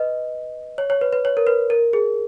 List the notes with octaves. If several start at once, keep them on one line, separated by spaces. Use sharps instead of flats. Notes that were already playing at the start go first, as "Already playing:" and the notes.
Already playing: B4 D#5
C#5
C#5
B4
B4
C#5
A#4
B4
A#4
G#4